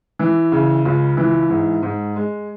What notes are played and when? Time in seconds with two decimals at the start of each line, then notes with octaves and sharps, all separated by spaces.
0.19 E3
0.52 C#3
0.85 C#2
1.17 E3
1.50 G#2
1.83 G#2
2.16 G#3